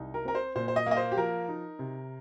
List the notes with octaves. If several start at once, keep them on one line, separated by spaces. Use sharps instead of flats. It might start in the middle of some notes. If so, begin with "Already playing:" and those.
Already playing: C2 D#4
A#4
C4 A#4
C5
A#2 C5
C5
D#5
A#3 D#5
C5
G4
F3 A#4
D#4
C3